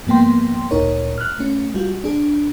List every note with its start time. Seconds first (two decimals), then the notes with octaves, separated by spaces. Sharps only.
0.07 G#2 F3 A#3 B3 G5 C6
0.71 D2 A#2 D#4 A#4 C#5
1.18 F6 F#6
1.39 A3 C#4
1.74 G3 F4 F#4
2.04 D4 G#4